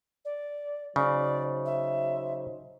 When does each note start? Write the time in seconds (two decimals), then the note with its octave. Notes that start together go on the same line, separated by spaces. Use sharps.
0.25 D5
0.96 C#3 F#3 D#4 C5 D5
1.66 E5